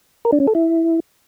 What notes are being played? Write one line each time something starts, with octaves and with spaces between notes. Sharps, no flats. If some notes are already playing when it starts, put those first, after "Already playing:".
A#4
D4
C#4
A4
E4